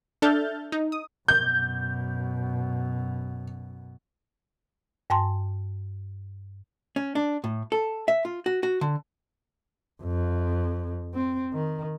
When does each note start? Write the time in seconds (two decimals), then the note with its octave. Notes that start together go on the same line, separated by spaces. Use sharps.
0.22 D4 A4 E5 F6 G6 A6
0.72 D#4
0.92 D#6
1.28 F#2 B2 G6
5.10 G2 G5 A5 C6
6.96 C#4
7.15 D4
7.44 A2
7.72 A4
8.08 E5
8.25 F4
8.46 F#4
8.63 F#4
8.81 D3
10.03 F2
11.14 C4
11.53 D#3